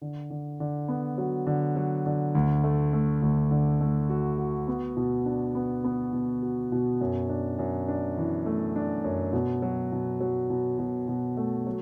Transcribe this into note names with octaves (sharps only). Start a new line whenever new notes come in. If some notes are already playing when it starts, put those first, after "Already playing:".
D3
D3
D3
B3
F#3
D3
F#3
D3
D2
A3
A3
D2
D3
A3
F#4
F#4
B3
B2
D4
B3
B3
B2
F#4
B2
F#2
D4
F#2
D4
E3
A3
D4
F#2
B2
F#3
B2
F#3
B2
B2
B2
A3
F#3